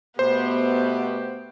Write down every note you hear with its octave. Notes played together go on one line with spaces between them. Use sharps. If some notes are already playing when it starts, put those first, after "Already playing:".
B2 A3 B3 G4 C5